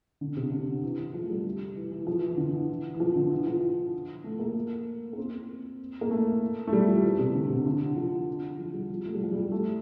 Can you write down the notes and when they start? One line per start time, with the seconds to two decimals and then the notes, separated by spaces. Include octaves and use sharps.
0.21 D3
0.37 C3
0.52 D3
0.68 D3
0.84 E3
0.98 E3
1.14 F3
1.23 A3
1.30 G3
1.76 E3
1.92 E3
2.07 F3
2.17 E3
2.28 E3
2.37 D3
2.47 E3
2.94 E3
3.00 F3
3.16 D3
3.31 E3
3.47 F3
4.24 A3
4.39 A#3
5.13 A#3
5.18 C4
6.01 A#3
6.11 A3
6.67 A3
6.73 G3
6.88 F3
7.03 E3
7.19 C3
7.34 D3
7.50 C3
7.66 D3
7.81 E3
7.96 F3
8.59 F3
8.74 G3
8.89 F3
9.05 A3
9.14 G3
9.24 F3
9.33 G3
9.52 A3